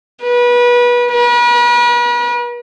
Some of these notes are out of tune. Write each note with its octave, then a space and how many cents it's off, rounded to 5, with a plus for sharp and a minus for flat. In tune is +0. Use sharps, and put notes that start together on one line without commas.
B4 -30
B4 -40